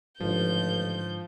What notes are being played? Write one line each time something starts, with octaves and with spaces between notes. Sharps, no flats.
A1 G#2 D3 F3 G6